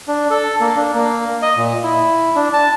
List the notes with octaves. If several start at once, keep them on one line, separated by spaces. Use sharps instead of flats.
D4
A4
A#3
D4
A#3
D#5
A#2
E4
D4
A5